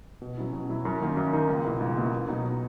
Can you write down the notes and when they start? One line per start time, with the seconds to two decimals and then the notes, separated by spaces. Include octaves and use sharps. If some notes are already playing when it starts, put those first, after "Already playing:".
0.22 B2
0.37 F#3 C#4 E4
0.53 B2
0.69 F#3 C#4 E4
0.85 F#2
1.01 D#3 A#3 D#4
1.17 F#2
1.33 D#3 A#3 D#4
1.49 C#2
1.64 B2 A#3 E4
1.80 C#2
1.97 B2 A#3 E4
2.13 B1
2.28 B2 F#3 B3 D#4